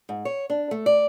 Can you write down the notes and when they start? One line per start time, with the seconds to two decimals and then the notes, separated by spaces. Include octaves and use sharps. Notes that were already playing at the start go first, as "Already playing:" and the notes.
0.09 G#2
0.25 C#5
0.50 D4
0.71 A3
0.86 D5